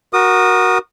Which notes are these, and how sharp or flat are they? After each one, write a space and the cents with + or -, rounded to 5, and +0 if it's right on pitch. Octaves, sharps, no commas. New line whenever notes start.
F#4 +0 A#4 +15 D#6 -25